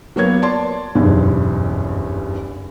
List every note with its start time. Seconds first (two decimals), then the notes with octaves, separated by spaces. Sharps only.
0.16 F#3 A#3 B3 C#5 G#6
0.42 D5 A5 C6
0.95 F#1 B1 E2 G2